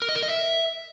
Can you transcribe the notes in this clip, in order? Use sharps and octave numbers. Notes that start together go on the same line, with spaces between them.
A#4
D#5
A#4
D#5
E5